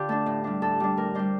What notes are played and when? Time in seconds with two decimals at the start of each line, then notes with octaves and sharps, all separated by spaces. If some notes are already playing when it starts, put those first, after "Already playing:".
Already playing: D3 F4 G4
0.09 A3 D4 A4
0.26 A2
0.44 G3 D4
0.62 A2 A4
0.80 G3 D4
0.97 A2 A#4
1.15 G3 D4 C5